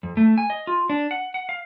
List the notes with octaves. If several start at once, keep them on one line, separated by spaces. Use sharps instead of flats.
F2
A3
G#5
D#5
F4
D4
F#5
F#5
F5